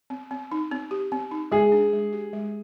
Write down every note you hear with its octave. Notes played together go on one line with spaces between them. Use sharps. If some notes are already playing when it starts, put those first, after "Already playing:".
C4
C4
D#4
C4
G4
C4
D#4
G#3 G#4
D4
G#3
G4
G#3